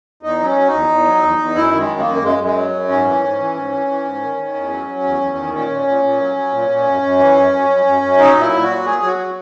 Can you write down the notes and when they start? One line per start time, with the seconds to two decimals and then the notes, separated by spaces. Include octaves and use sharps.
0.23 E2 D#4
0.40 F#3 C#4
0.56 F#3
0.68 D#4
0.73 E2
0.89 E2
1.06 F#3
1.22 E2
1.38 E2
1.55 F#2 E4
1.72 D#3 G#3
1.89 F#2
2.00 F#2 A#3
2.21 F#2 G#3
2.38 F#2
2.44 G#3
2.56 F#3
2.72 F#2
2.88 G#2 C#4
3.05 E3
3.21 G#2
3.39 E3
3.54 G#2
3.72 E3
3.87 E3
4.05 G#2
4.21 D#3
4.37 D#3
4.54 E2
4.70 F#3
4.87 F#3
5.04 E2
5.21 E2
5.36 D#3
5.53 A#2 C#4
5.70 A#2
5.87 A#2
6.03 A#2
6.20 F#3
6.36 F#3
6.52 A#2
6.69 A#2
6.86 F#2
7.02 F#2
7.19 E3
7.36 F#2
7.53 F#2
7.70 F#2
7.86 F#2
8.02 F#2
8.19 F#3 D#4
8.35 A#2
8.40 E4
8.52 A#2
8.63 F#4
8.69 F#3
8.85 F#3 G#4
9.02 F#3 F#4
9.18 F#3